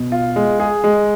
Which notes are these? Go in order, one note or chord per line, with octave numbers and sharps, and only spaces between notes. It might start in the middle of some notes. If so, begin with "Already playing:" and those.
Already playing: B2
F4
G#3
G#4
G#3